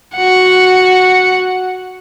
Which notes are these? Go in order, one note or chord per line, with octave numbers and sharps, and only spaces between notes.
F#4 F#5